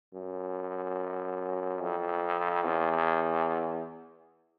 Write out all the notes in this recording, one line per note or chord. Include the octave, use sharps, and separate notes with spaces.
F#2
F2
E2